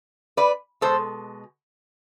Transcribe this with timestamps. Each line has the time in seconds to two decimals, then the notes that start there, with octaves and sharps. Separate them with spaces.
0.37 B4 D5
0.81 B2 G#3 A4 C5